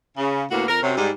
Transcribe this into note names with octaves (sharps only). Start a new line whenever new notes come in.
C#3
D2 A2 A#3 B3 F#4
F2 A#4
F#2 C3 F#3
G#2 G3